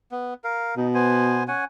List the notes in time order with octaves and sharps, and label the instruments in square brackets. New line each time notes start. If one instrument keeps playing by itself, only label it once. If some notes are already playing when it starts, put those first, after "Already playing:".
[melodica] B3
A#4 F5
[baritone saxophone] B2 [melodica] D#4
[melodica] B3 C5 G#5
C#4 F#5 G#5